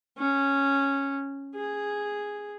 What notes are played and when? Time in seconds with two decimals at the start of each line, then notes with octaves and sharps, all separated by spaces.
0.18 C#4
1.56 G#4